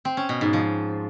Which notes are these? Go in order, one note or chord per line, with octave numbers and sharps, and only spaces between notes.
C4
C#4
B2
G#2
F3